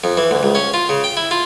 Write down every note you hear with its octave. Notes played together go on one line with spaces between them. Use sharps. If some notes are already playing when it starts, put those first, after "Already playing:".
F2
E3
D2
C#2
C#4
F4
C#3
G5
E4
F4